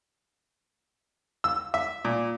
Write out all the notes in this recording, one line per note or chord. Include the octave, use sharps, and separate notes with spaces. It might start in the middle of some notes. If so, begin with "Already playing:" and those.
E6
E5
A#2